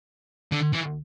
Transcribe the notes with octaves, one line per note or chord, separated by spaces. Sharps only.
D3
E3